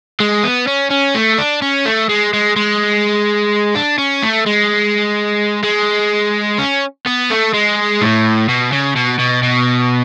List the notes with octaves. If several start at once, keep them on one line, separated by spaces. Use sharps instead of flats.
G#3
B3
C#4
C#4
A3
D4
C#4
A3
G#3
G#3
G#3
D4
C#4
A3
G#3
G#3
C#4
B3
A3
G#3
A2
B2
C#3
B2
B2
B2